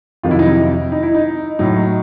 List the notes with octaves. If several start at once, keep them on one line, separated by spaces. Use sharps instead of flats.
F2 C3 D#3 F#3 F4
E4
D#4
E4
D#4
E4
D#4
A2 F#3 D#4